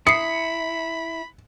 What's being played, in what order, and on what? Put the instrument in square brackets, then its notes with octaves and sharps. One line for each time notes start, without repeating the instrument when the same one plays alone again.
[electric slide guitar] E4 [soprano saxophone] B5 [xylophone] D#6 C7 [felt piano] C#7